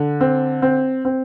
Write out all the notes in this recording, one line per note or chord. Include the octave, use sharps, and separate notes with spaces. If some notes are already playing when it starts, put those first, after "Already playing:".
Already playing: D3
C4
C4
C4